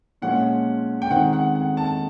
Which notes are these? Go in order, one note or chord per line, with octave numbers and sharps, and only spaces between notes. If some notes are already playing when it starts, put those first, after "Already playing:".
A#2 F3 G#3 C#4 F4 F#5
G5
D#3 G#3 C4 D#4 F#5
F#5
F#5
A5